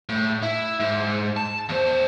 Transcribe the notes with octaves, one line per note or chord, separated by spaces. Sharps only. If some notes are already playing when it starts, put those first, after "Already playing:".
A2
E4
G#2
A5
E2 C5